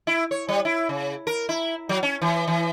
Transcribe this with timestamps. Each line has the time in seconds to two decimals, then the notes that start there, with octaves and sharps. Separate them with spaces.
0.07 E4
0.31 C#5
0.49 G3
0.65 E4
0.89 C#3
1.27 A#4
1.49 E4
1.89 F#3
2.03 C#4
2.22 E3
2.48 E3